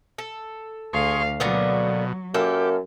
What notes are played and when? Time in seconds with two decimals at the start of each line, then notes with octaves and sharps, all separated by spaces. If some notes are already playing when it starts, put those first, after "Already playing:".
0.18 A4
0.93 D2 G#4 F5 C6 C#6
1.40 B2 D3 F#3 A#3 B3
2.34 F#2 A#3 G4 A4